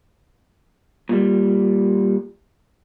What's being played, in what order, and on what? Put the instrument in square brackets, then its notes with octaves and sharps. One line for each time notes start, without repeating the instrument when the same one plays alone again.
[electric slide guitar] A#2 G3